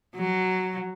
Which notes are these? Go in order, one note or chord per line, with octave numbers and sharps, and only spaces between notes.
F#3